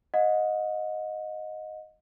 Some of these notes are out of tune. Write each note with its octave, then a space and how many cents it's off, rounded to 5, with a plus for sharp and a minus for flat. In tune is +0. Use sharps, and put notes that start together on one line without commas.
D#5 +0 F#5 -35